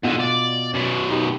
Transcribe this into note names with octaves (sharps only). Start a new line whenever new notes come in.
G#2 B2 D3 F4
D5
F#2 B2
D#4 G4